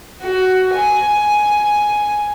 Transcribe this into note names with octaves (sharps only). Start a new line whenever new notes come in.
F#4
G#5